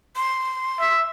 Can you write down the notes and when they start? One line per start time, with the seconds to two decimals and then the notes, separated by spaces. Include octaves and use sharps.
0.16 C6
0.80 E5